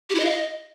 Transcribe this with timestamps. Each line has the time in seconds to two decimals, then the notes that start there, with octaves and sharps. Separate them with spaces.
0.10 G4
0.15 E4
0.20 D#5
0.25 F5
0.30 D#5